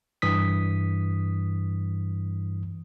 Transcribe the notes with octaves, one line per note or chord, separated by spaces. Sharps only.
G2 E3 D#6 B6